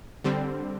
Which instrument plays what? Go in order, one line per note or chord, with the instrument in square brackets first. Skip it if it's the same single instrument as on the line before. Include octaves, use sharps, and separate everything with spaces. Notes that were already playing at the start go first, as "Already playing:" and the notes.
[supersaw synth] D3 G3 C4